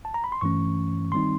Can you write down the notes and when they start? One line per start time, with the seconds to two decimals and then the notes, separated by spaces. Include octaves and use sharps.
0.05 A5
0.14 A#5
0.24 B5
0.32 C6
0.41 G2 E3 A3 C#4 C#6
1.12 D#3 G3 C4 D#4 C6